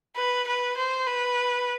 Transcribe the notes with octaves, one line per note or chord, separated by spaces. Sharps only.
B4
B4
C5
B4